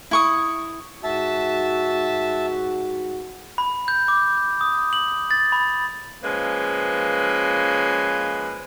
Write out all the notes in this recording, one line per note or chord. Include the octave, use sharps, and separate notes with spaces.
E4 C#6 D#6
G#2 F#4 E5 A5
B5
G6
D6
D#6
F#7
A6
B5
F3 G#3 A#3 C#4 B4